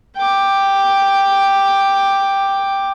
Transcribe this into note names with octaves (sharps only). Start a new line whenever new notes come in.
G5 D6